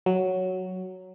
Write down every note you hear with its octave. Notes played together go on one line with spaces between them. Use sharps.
F#3